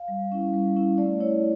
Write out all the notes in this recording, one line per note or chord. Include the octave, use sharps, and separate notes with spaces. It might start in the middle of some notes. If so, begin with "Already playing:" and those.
Already playing: F5
G3
C#4 E4
G3
C#4 E4
A3 D5
E4 C#5